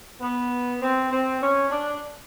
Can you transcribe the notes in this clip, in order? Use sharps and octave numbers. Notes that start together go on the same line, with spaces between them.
B3
C4
C4
C#4
D4